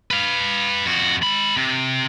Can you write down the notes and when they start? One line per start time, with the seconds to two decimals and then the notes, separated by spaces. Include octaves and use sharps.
0.11 B4 F5
0.86 F2 F#4
1.22 G#3 B5
1.57 C3